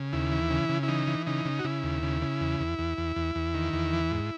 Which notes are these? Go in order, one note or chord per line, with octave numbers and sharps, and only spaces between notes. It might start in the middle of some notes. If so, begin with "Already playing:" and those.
Already playing: C#3
D#2 E4
E3
C#3
C#3
E4
E3 D#4
E3
C#3 D#4
C#3
F#4
C#3 E4
D#2
C#3
C#3
E2
E2
E2
E2
E2
E2
D#3
E2
E3
G#2